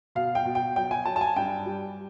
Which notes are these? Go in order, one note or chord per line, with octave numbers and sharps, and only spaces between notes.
B2 F5
G5
B2
G5
F#3 G5
G#5
F#3 A5
A5
G#5
G2 G5
G3